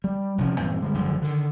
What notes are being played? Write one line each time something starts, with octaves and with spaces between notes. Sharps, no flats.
G3
E1 C3 F3 C#4
G2 A#2 E3 C4
D3 G3 G#3
G#1 F#2 D3 F3
D3 D#3